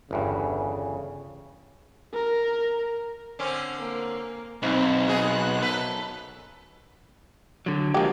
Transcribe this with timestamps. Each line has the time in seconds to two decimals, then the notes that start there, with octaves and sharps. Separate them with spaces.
0.11 G1 E2 G2 C#3
2.14 A#4
3.39 D3 C4 C#4
3.78 A#3
4.63 B1 G#2 C4 B5
5.07 B3 F#4 G#4 F#6
5.61 F#2 A4 B4
7.66 D3 F#3
7.94 F3 G#3 A#3 G4